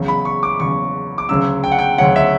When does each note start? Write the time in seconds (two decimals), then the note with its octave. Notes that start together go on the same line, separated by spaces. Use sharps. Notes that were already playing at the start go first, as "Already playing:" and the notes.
Already playing: E2 C#3 F#3
0.08 B5
0.25 C#6
0.43 D6
0.60 E2 C#3 F#3 C#6
1.18 D6
1.29 D2 C#3 F#3 C#4 E6
1.64 G5
1.72 F#5
1.79 G5
1.98 D2 C#3 F#3 C#4 F#5
2.16 E5